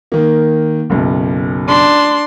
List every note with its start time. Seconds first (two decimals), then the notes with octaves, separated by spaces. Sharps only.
0.12 D#3 A#3
0.90 F#1 B1
1.68 D4 C6